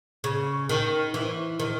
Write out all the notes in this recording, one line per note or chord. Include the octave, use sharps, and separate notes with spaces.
C#3
D#3
E3
D#3